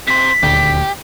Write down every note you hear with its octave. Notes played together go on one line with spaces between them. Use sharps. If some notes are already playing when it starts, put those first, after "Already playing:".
C3 C5 B6
D#1 D2 G4